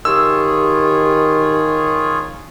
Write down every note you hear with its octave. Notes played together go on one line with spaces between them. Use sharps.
D#3 F4 G4 G#4 C#5 E6